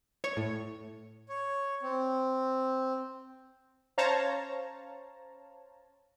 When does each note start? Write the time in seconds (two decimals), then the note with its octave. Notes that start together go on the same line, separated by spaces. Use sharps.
0.24 C#5 C#6
0.37 A2
1.29 C#5
1.83 C4
3.98 C#4 C5 C#5 F5 A5 A#5